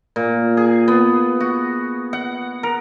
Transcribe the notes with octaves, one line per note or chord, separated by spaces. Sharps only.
A#2
G#4
B3
F#4
F#5
A#4